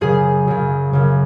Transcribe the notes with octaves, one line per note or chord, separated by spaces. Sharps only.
F#2 C#3 G#4
F#2 C#3
F#2 C#3